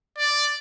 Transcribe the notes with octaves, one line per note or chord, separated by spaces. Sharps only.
D5